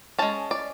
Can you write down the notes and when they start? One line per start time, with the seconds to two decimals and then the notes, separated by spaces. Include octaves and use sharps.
0.19 G#3 C#4 A5
0.51 D5